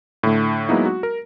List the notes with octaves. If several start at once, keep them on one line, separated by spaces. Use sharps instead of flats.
A2 D3 A3
F#3 G#3 A#3 B3 D#4 E4
F#4
A#4